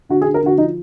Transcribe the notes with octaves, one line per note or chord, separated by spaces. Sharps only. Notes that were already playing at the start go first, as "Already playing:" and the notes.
D3 F#4
G#4
D3
A#4
D3 F#4
F3 D#4